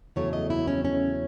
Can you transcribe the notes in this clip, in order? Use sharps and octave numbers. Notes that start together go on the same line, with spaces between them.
E2 C#3 F#3 A3 C#5
D#5
E4
C#4
C#4